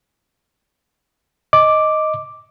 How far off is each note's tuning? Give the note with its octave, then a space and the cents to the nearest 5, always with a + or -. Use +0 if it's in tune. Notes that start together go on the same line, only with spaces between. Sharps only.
D#5 +5 D6 +0